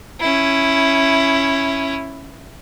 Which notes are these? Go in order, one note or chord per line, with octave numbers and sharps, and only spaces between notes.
C#4 E4